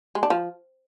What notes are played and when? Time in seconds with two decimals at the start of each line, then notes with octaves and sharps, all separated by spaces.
0.15 G#3
0.23 D4
0.30 F3